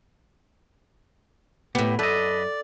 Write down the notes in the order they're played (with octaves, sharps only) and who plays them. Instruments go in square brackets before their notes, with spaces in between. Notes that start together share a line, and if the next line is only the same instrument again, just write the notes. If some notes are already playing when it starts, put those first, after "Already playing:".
[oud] A2 B3 [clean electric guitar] G4
[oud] F#2 [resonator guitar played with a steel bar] A4 [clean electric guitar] B4 D#5 [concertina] D5